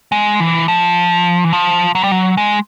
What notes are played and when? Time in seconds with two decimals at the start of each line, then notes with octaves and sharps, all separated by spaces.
0.12 G#3
0.40 E3
0.68 F3
1.44 E3
1.53 F3
1.95 F#3
2.03 G3
2.11 F#3
2.37 G#3